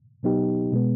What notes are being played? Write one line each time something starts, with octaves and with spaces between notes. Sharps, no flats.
B2 F#3 B3 D#4 G4
B2 G#3 B3